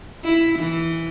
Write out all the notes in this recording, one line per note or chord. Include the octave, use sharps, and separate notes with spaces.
E4
E3